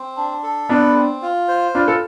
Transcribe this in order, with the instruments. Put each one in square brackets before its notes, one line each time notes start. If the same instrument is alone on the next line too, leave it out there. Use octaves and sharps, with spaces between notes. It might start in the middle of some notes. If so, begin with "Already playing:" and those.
Already playing: [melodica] C4
D4
A4
[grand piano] B3 D4 [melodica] B4
[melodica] C4
F4
C5
[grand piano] D4 F4 [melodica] B4
[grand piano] F4 A4